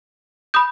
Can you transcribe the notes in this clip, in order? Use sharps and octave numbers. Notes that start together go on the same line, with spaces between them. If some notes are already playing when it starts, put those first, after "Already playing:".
B5 D#6 G6